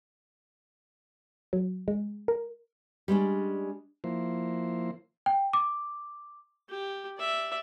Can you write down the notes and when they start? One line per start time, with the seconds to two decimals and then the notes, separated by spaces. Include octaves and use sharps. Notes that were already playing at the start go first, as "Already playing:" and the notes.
1.53 F#3
1.88 G#3
2.28 A#4
3.08 G3 G#3 C#4 D4
4.04 F3 A#3 E4 C5
5.26 G5
5.53 D6
6.69 G4
7.18 D5 E5